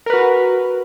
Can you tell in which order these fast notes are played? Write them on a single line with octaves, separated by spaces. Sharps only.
A#4 B4 F#4